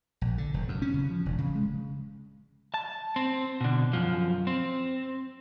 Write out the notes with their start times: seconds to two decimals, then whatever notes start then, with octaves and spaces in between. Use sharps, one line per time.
0.21 A#1
0.38 D3
0.54 F1
0.68 F#2
0.82 C#4
0.94 C#3
1.10 F3
1.26 E1
1.38 C#3
1.55 G#3
2.74 A5
3.16 C4
3.61 B2 D3
3.93 F#2 F3
4.47 C4